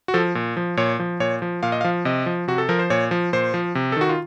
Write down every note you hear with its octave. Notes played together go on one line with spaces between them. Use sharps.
F#4
F3 A4
A#2
F3
A#2 C#5
F3
A#2 C#5
F3
A#2 F5
D#5
F5
F3
C3 D#5
F3
C3 F#4
A4
F3 A#4
C5
A#2 C#5
F3
A#2 C5
F3
C3
A4
D#3 F#4
F4